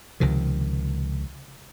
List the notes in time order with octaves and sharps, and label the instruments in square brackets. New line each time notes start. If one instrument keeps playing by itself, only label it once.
[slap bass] C#2 C3 D#3 F3